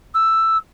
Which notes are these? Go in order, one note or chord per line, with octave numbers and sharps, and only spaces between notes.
E6